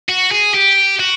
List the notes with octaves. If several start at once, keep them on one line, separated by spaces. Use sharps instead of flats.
F#4
G#4
G4
F#4